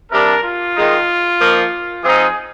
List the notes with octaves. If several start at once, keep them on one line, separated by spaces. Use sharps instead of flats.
C3 G3 D4 A#4
F4
D#3 G#3 D#4
F3 A#3 D#4
F3 C4 D#4 G#4